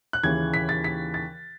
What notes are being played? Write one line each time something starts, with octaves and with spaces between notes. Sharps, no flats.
F#6
D#2 C#3 E3 G#6
B6
A6
B6
A6